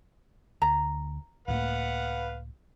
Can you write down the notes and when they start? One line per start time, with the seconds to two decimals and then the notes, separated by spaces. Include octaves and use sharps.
0.62 D2 A#5
1.48 C#2 A2 A#3 B4 F5 F#5